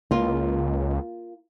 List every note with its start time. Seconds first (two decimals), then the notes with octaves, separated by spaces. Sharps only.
0.11 C#2 A#3 F4